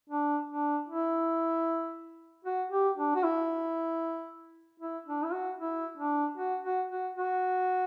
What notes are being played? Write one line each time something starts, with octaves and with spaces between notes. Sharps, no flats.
D4
D4
E4
F#4
G4
D4
F#4
E4
E4
D4
E4
F#4
E4
D4
F#4
F#4
F#4
F#4